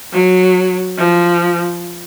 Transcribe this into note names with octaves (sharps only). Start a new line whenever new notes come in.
F#3
F3